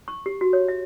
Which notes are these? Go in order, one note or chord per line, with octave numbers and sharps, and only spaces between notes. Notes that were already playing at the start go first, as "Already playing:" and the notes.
C#6
G4
F#4
C#5
E5